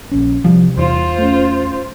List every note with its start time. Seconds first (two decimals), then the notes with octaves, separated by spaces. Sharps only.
0.11 A#1 C#4
0.44 C3 F3 G3
0.78 E2 F4 C5
1.19 A3 C#4